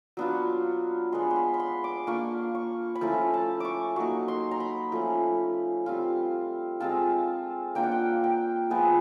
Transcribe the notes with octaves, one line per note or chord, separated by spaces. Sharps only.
F#3 B3 D4 F4
G#3 B3 D4 C6
C6
B5
B5
C6
D6
A#3 D4 F4 C#6
C#6
B5
F3 A3 C#4 E4 A#5
A5
C#6 D6
F#3 A#3 D#4 C#6
C6
A#5
B5
F3 A3 C#4
G3 C4 F4
G#3 C4 F4 A5
A#3 D4 F4 G5
F#5
G5
G5
F3 G#3 B3 G#5